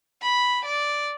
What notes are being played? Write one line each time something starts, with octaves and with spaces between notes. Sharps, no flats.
B5
D5